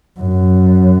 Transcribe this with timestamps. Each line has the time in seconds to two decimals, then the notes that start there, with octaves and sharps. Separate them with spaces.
0.20 F#2